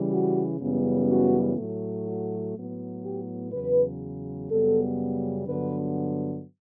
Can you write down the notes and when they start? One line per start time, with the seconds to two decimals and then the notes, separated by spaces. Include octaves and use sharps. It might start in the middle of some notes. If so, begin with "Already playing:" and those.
Already playing: C#3 E3 G3
0.12 F#4
0.60 F#2 C#3 E3 G3 B3
1.09 F#4
1.57 A2 F#3 A3
2.06 F#4
2.55 A2 F#3 B3
3.04 G4
3.52 E2 C#3 F#3 B4
4.49 F#2 C#3 G3 B3 A4
5.46 G2 D3 F#3 B3 B4